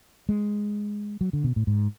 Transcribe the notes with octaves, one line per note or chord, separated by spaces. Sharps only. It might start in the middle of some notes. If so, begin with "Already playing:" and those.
G#3
F#3
D3
B2
A2
G#2